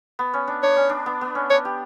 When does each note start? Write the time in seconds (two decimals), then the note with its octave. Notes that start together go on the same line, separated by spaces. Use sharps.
0.19 B3
0.34 C#4
0.48 D4
0.63 D4 C#5
0.77 C#4
0.89 D4
1.06 B3
1.21 B3
1.35 C#4
1.50 D4 C#5
1.65 G4